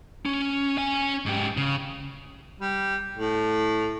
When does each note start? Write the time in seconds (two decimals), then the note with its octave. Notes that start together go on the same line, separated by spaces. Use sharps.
0.26 C#4
0.78 C#4 G#5
1.26 G#2 G4
1.57 C#3
2.61 G3
3.18 A2